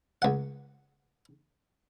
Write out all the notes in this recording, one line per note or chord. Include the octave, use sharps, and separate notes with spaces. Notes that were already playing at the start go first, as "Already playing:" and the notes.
C#2 F#5